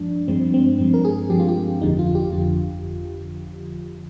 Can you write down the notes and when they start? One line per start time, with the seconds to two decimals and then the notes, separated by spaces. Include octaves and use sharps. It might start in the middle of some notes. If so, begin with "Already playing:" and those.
Already playing: G2 F3 G#3 D4
0.28 G2 F3 G#3 C4
0.54 C4
0.78 G2 F3 G#3 C4
0.94 A#4
1.05 G#4
1.30 G2 F3 G#3 G4
1.40 F4
1.48 G4
1.81 G1 F2 D3 F3 D#4
1.99 F4
2.15 G4
2.32 G1 F2 D3 F3 F4